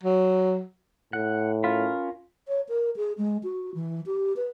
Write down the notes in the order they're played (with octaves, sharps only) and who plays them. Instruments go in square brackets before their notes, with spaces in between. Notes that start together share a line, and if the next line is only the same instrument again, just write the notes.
[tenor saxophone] F#3
[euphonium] A2 [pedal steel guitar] F#5
[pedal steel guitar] C#4 A#4 B5 [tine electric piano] F4
[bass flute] C#5
A#4
G#4
G#3
F#4
E3
G4
B4